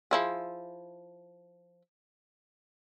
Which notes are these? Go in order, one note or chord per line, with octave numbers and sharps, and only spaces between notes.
F3 E4 G#4